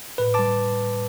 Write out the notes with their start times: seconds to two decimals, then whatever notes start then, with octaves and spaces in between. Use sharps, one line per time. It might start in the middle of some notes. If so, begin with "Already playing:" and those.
0.18 A2 B4
0.34 G3 A5 D6